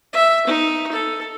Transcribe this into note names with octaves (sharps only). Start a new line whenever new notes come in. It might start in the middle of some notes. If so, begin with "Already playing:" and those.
E5
D#4
A4